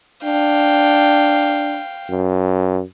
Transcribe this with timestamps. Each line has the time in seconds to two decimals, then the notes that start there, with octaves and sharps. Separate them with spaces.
0.24 D4 F5 G5
2.10 F#2